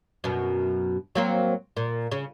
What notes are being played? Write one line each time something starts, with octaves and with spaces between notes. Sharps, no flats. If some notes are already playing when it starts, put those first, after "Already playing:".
F#2 B2
F#3 A#3 C4
A#2
C#3